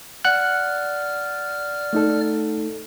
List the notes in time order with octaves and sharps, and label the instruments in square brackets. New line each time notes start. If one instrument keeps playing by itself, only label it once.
[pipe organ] D5 F6 [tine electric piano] F#5 F#6
[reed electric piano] A3 D#4 A4